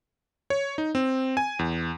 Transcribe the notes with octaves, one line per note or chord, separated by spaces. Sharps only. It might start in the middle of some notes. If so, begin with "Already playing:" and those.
C#5
D#4
C4
G#5
E2